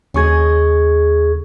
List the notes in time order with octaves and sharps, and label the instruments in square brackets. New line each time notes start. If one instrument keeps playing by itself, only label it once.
[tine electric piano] D#2 C#6 G#6 [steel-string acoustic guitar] C#3 G#4 D#5